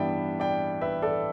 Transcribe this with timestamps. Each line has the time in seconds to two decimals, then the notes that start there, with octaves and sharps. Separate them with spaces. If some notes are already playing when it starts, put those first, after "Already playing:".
Already playing: G2 E3 B3 D5 E5 G5
0.40 D5 G5
0.81 B4 E5
1.02 A4 D5